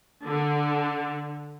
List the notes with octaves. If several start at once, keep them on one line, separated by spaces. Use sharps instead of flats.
D3